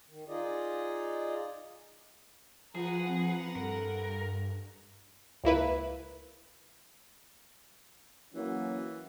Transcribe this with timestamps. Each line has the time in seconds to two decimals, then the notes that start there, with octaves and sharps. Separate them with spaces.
0.08 D#3
0.28 D#4 F4 G#4 D5 D#5
2.75 F3 F4 G#4 B4 F#5 A#5
3.07 C4
3.56 G2 A4 A#4
5.44 C#2 A#3 E4 B4
8.34 E3 F#3 A#3 C#4